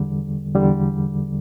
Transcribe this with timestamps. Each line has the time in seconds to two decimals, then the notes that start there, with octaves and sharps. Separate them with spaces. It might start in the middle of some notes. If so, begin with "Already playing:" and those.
Already playing: E2 D3 G3
0.54 E2 D3 G3